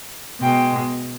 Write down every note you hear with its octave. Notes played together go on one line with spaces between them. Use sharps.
B2 G#3 G5